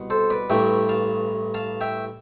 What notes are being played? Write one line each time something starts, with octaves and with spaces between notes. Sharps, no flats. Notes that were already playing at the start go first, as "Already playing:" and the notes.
Already playing: C2 B2
A4 C5
B4 D5
A1 G2 E3 A3 E5 G5
F5 A5
F5 A5
E5 G5